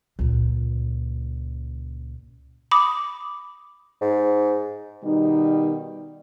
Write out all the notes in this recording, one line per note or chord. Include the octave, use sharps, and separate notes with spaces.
C#2 A#2
B5 D6 D#6
G#2
B2 D#3 G3 D#4